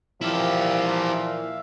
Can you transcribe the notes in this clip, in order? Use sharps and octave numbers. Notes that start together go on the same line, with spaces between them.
A#2 E3 F3 E4 G4 E5 F5